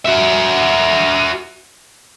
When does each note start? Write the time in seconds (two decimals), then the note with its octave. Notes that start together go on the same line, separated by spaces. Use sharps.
0.06 F#4 E5